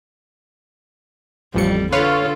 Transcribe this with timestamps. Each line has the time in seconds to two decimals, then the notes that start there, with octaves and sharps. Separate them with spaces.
1.54 A1 F2 G3 C#7
1.92 D3 F4 A4 B4 C#5 F5 C6